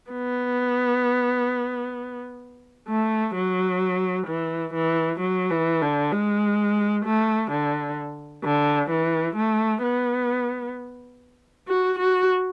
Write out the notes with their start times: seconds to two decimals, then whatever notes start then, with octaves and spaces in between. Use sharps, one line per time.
0.11 B3
2.89 A3
3.35 F#3
4.27 E3
4.74 E3
5.20 F#3
5.51 E3
5.82 D3
6.13 G#3
7.06 A3
7.52 D3
8.44 D3
8.91 E3
9.36 A3
9.83 B3
11.68 F#4
11.99 F#4